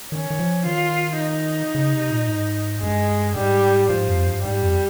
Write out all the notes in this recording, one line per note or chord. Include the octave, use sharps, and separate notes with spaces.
D#3 C#4
D#3
F3
D#3 F4
D#4
C#3
C3
A#2
G#2
G2 G#3
G#2 G3
G#2 F3
F2
G2
G#2 G3
F2